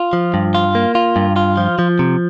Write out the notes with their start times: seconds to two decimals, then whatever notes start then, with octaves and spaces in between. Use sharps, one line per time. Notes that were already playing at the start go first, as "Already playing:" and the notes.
Already playing: F4
0.13 F3
0.34 G2
0.55 F4
0.75 A#3
0.95 F4
1.16 G2
1.36 F4
1.57 F3
1.79 F3
1.99 C3